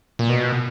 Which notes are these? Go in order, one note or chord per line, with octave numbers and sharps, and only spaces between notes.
A#2
B2